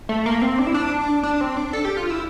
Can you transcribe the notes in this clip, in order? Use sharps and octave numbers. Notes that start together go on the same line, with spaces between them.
A3
A#3
C4
D4
E4
D4
D4
C4
D4
A4
G4
F4
E4